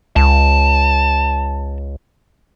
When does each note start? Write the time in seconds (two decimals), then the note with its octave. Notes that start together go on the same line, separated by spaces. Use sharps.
0.16 C#2 A5